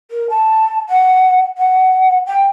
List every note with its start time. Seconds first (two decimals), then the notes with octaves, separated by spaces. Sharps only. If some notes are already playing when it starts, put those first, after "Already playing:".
0.11 A#4
0.30 A5
0.89 F#5
1.58 F#5
2.27 G5